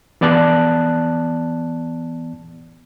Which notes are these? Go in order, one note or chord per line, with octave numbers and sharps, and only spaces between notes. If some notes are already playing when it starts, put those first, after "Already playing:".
E3 B3 D5 A5 F#6